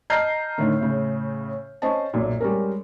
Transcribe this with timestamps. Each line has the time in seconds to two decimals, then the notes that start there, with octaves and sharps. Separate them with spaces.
0.10 D#5 A5 A#5 F6 G6 C7
0.58 A2 D3 D#3
0.80 A2 C#3
1.82 C#4 C5 D#5 A5
2.14 B1 F#2 A#2
2.41 G3 G#3 C#4 A#4